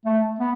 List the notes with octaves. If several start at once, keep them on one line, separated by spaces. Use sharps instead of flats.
A3
B3